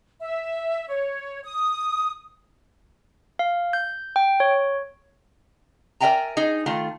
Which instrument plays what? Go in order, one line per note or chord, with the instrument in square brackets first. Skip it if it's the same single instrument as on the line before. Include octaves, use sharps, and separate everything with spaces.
[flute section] E5
C#5
D#6
[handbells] F5
G6
G5
C#5
[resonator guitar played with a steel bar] A#4 D5 E5 G5 G#5 A#5
D#4 G#4
D#3 A3 F4